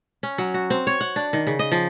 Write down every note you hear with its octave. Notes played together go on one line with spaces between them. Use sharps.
C#4
F#3
F#4
C4
C#5
F#5
D4
D#3
C#3
D#5
F3